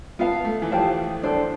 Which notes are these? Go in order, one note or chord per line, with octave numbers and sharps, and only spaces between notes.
B3 F4 B4 F5 A5
A3
E3
F3 G4 C5 F5 A5
D4 A4 C5